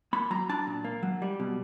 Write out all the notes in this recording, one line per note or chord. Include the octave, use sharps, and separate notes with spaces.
A#3 B5
F#3 A#5
D4 A5
A#2
A#3
F#3
G3
B2